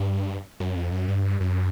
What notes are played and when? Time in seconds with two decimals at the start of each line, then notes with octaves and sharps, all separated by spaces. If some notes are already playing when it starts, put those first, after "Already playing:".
Already playing: G2
0.60 F#2
0.76 F2
0.92 F#2
1.08 G2
1.40 F#2